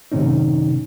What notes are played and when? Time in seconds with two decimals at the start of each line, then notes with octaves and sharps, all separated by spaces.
0.12 F#2 A2 C3 D#3 C#4 D#4